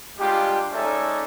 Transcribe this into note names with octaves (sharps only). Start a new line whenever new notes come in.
G3 G#3 D4 F4 G4
G#3 C#4 D#4 A4 D5 E5